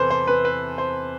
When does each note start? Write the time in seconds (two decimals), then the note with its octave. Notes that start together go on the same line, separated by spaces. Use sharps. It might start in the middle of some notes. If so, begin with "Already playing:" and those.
Already playing: E2 C3 E3 A4 B4 C5
0.10 C5
0.27 B4
0.45 B4
0.78 C5